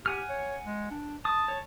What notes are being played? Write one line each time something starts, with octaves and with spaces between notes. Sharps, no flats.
G4 F#5 G#5 F6
C#5
G#3
D4
A5 D#6
C#5